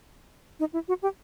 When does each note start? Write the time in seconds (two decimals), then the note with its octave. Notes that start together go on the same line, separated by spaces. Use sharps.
0.60 D#4
0.73 E4
0.88 F#4
1.02 G4